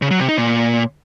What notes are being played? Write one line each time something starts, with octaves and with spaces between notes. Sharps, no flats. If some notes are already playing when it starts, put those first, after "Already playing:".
C#3
F#3
C3
D#4
A#2